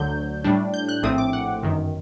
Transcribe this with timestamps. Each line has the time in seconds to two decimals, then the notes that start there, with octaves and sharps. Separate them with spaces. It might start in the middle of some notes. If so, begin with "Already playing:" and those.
Already playing: D2 D3 F#3 G6
0.44 A2 G3 D4
0.74 G6
0.89 F#6
1.03 A#1 A2 A3 C4 D#6
1.18 D6
1.33 F#5
1.62 G1 F#2 D#3